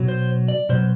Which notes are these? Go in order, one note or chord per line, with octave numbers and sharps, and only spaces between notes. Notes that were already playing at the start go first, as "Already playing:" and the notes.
Already playing: B2 F#3
C5
D5
B2 F#3 C5